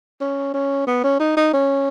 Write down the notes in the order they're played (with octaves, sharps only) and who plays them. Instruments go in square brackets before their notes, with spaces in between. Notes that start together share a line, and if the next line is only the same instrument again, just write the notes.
[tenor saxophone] C#4
C#4
B3
C#4
D#4
D#4
C#4